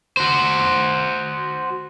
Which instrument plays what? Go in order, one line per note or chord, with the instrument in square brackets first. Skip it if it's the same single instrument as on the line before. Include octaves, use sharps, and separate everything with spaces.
[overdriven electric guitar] F#4 C5